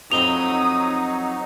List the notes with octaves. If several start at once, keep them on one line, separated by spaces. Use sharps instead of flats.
F2 F#3 C4 D#4 B5 D#6 F7 G7